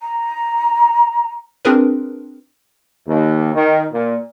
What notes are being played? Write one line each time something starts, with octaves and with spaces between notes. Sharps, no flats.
A#5
C4 D4 F4 G#4 A#4 B4
D#2
D#3
A#2